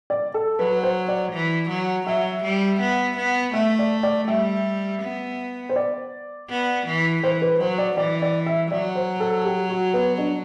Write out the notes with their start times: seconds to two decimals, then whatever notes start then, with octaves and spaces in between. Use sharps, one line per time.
0.10 D5
0.34 A4
0.59 F#3 B4
0.83 C5
1.08 D5
1.32 E3
1.70 F#3
2.07 F#3 E5
2.44 G3
2.80 B3
3.17 B3
3.54 A3 E5
3.79 D5
4.03 D5
4.28 G3 E5
5.02 B3
5.69 C5
5.76 D5
6.50 B3
6.87 E3
7.23 E3 C5
7.42 B4
7.61 F#3 C5
7.78 D5
7.97 E3 D5
8.22 D5
8.46 E5
8.71 F#3 D5
8.95 C5
9.20 A4
9.45 G4
9.70 F#4
9.94 B3
10.18 D4